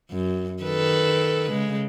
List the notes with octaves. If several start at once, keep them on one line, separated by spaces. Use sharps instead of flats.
F#2
D#3 A4 B4
C#3 G#3